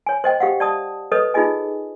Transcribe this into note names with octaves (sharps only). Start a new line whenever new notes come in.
C#5 G#5
C5 D#5 G5
G4 F5 F#5
D5 A5 D#6
A4 B4 C#5 D#5 D#6
D#4 F4 G#4 D#5 G#5